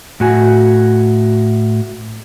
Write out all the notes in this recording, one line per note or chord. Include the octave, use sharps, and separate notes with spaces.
A2 F#4 G#5